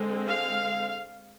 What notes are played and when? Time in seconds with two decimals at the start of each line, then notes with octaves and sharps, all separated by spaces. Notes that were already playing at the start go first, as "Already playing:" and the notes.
Already playing: D3 G#3 C4
0.27 F5